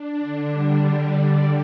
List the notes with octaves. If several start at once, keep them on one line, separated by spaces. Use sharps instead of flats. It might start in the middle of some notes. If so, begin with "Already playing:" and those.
Already playing: D4
D3
G3